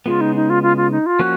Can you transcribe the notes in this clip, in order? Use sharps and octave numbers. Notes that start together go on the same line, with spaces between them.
C#3 G#3 B3 F4
D#4
D#4
F4
F4
F4
D#4
F4
F3 A#3 C#4 F#4